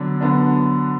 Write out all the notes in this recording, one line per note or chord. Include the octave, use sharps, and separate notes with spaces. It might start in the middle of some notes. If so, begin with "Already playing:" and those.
Already playing: D3 F#3 B3 D4
D3 F#3 B3 D4